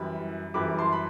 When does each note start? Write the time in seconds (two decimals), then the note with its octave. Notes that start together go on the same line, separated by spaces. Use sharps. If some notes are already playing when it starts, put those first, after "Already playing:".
Already playing: F#2 E3 G3 B5
0.54 F#2 E3 G3 B5 D6
0.78 A5 C6
0.92 B5